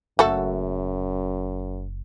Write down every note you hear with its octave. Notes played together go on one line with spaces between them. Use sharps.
F#1 F#2 A3 F#4 A4